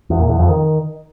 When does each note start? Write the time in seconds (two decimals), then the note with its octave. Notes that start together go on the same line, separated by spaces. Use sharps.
0.10 E2
0.20 A#2
0.29 E2
0.39 F2
0.49 D#3